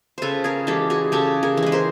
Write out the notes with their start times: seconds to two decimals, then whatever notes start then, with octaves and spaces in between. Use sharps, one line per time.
0.18 C#3 A4 B4 C5
0.44 G#4 A#4
0.67 E3 G#3 G4 A4
0.90 F#4 G#4
1.12 C#3 G4 A4
1.43 G#4 A#4
1.57 E3
1.63 G#3 B4
1.72 A#4 C5